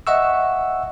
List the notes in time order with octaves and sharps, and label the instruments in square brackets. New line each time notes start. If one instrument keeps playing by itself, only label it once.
[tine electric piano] D#5 E5 F#5 C#6 E6